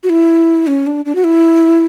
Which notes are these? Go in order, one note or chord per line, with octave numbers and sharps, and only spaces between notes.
F#4
E4
C#4
D4
D4
F#4
E4